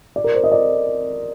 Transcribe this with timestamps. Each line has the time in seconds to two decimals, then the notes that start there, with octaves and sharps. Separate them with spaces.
0.16 D5
0.24 A#4
0.35 C5
0.44 D#5
0.52 D5